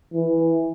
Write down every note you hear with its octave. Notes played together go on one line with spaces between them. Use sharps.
E3